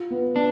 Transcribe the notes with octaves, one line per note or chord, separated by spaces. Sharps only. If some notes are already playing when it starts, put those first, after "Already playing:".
Already playing: F4
B3
B3 D4